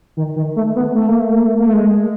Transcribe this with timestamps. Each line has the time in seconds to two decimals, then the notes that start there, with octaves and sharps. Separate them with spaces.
0.17 D#3
0.36 D#3
0.56 A3
0.76 B3
0.95 A3
1.08 A#3
1.20 A3
1.33 A#3
1.45 A3
1.59 A#3
1.67 A3
1.73 G#3